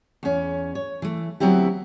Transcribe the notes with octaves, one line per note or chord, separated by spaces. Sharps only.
E2 C#4
C#5
E3 A3
D2 F#3 B3 C4 E4 G4